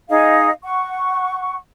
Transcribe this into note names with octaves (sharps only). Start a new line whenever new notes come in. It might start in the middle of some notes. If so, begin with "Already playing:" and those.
D#4 G#4 D#5 F5
F#5 C#6